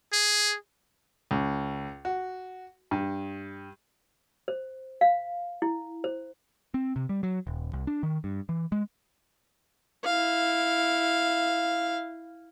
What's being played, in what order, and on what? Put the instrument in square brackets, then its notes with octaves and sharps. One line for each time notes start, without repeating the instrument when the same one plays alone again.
[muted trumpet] G#4
[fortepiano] C#2
F#4
G2
[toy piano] C5
F5
E4
C5
[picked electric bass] C4
C3
G3
F#3
D#1
C2
D4
D#3
G2
E3
G#3
[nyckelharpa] E4 F5